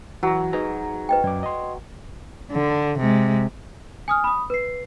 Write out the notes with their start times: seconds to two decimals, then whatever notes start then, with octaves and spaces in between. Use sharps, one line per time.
0.23 E3 F#3 A#5
0.53 D#4 G#4 B4 A#5
1.09 B4 D#5 G5
1.24 F#2 D5 D6
1.43 D#5 C6
2.52 D3
2.99 C3 G#3
4.08 G#5 D#6 F6
4.24 B5 D#6
4.50 B4 C7